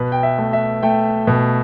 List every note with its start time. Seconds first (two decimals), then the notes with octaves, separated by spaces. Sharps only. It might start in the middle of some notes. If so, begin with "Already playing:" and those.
Already playing: B2 B4
0.12 G5
0.23 E5
0.38 A3
0.53 E5
0.83 A3 G5
1.27 B2